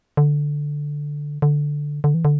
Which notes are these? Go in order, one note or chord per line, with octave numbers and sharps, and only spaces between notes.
D3
D3
D3
E3
D3